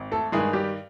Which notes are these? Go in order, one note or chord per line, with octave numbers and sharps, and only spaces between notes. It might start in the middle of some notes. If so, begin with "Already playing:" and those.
Already playing: G#1
A3 A4
G2 D#3 G#3 G#4
G3 G4